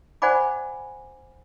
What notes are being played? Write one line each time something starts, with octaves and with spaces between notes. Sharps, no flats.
C5 D5 F#5 G#5 B5 D6